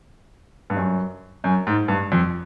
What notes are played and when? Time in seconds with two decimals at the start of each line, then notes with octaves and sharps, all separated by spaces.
0.70 G2
0.77 F#2
1.44 F#2
1.67 G#2
1.88 G2
2.12 F2